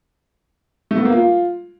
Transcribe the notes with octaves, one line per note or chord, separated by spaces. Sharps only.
A3
B3
A#3
F4